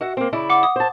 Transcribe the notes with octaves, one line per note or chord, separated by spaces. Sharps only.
F#4 E5 F#5
A#3 C4
C#3 E4 D5
F#5 D6
D#6
C5 A5